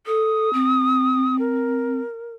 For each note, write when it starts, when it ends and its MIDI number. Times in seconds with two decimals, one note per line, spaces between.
0.07 0.49 69
0.07 1.36 87
0.54 2.01 60
1.39 2.36 70